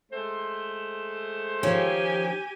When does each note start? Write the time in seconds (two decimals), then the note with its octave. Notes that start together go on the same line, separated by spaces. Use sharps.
0.12 G#3 A3 C5
1.63 D#3 F3 C#4 G4 G#5